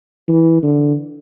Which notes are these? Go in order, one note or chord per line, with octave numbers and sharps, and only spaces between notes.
E3
D3